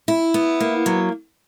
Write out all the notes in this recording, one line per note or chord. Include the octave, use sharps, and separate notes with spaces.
E4
B3
A#3
F#3